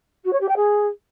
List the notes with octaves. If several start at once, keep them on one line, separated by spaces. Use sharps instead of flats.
F#4
C#5
G4
G5
G#4